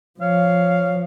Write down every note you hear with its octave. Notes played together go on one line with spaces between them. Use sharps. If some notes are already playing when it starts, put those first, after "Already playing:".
F3 C#5 F5